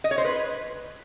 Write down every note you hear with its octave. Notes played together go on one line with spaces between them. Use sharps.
D#5
C#5
C5
B4